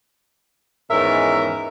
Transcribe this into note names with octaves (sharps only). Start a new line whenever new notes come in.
E2 G#2 D#3 C#4 A#4 E5